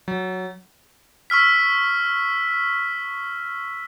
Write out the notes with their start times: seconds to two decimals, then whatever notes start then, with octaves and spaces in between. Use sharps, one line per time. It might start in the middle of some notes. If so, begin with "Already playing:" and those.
0.08 F#3
1.30 C#6 E6 F6 B6